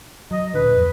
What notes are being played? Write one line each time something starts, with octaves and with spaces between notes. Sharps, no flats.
F#3 D#5
D1 A#2 D3 B4
F2